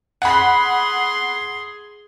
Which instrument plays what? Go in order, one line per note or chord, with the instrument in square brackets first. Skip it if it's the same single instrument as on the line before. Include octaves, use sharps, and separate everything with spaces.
[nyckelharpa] G#4 C6 [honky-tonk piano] F#5 B5